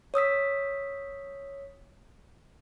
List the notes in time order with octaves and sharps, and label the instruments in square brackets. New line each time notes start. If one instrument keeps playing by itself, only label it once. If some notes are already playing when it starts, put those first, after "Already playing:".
[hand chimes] C#5 D#6 E6 B6